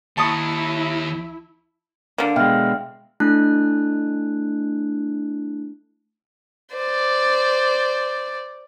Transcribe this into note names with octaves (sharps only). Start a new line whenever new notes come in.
D#2 E4 A5 C#6 D#6
D3 A#3
B2 G#3 E5 G5 F6
A3 D4 E4 A5 F#6
C5 D5